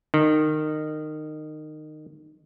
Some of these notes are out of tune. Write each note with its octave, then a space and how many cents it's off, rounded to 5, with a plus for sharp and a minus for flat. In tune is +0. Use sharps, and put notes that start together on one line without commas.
D#3 -20